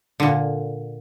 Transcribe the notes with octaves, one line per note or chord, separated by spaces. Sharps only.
A#2 D3